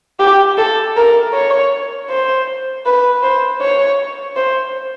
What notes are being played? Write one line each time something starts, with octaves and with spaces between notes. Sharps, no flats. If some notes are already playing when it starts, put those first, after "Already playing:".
G4
A4
A#4
C#5
C5
B4
C5
C#5
C5